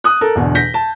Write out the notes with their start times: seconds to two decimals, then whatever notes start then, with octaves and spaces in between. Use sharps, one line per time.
0.04 D#6 F#6
0.21 A4 A#4
0.35 E2 B2 D3
0.55 G6 A#6 B6
0.74 A5